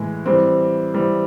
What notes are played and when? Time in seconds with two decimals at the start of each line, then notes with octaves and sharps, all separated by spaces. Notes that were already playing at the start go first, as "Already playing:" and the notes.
Already playing: A2 E3 G#3
0.26 E3 G3 C4
0.94 E3 G3 C4